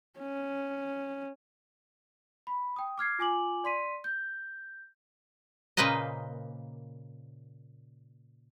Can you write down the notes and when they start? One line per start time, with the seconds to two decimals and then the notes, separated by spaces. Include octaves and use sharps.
0.19 C#4
2.47 B5
2.76 G5 D#6
2.98 D6 F6 G#6 C7
3.19 F4 G#5 D6 F#7
3.64 D5 C6 B6 D#7
4.04 G6
5.77 A#2 C#3 A#3 B4 C5 D#5